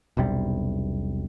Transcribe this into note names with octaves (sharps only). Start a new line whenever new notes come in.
E1 B1 C3 G3